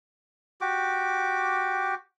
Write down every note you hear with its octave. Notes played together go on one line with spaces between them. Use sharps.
F#4 G4 D6